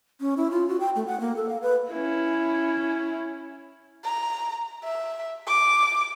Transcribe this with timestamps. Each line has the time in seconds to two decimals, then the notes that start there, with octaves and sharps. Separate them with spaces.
0.21 C#4
0.37 E4
0.51 F4
0.68 F#4
0.80 G5
0.96 A3
1.07 F#5
1.20 A#3
1.36 A4
1.49 F5
1.62 B4
1.92 C#4 E4
4.04 A#5
4.84 E5
5.47 D6